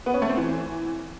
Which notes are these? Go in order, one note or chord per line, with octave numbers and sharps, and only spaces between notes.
B3
C#4
A3
C4
E3